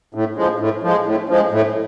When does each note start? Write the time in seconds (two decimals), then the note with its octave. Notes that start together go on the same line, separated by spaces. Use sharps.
0.15 A2
0.37 F3 G#3
0.59 A2
0.83 F3 G#3
1.06 A2
1.29 F3 G#3
1.52 A2